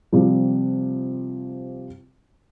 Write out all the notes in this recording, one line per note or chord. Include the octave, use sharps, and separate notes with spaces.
C3 F3 G3